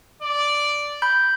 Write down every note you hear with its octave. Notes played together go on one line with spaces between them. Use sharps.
D5
B5 G6